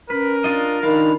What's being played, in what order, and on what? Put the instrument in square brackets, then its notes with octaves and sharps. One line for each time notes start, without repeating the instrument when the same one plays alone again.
[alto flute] C#4 [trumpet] A#4 [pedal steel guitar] B4
[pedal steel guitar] D4 F4 D#5
[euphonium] D#3 [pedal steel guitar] D4 F4 F5 [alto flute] B5